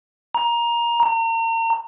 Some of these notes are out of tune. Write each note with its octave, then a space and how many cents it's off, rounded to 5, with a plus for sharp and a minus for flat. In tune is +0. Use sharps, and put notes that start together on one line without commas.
A#5 +15
A#5 -40